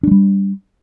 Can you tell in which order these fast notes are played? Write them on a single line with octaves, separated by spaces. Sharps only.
D4 G#3 G3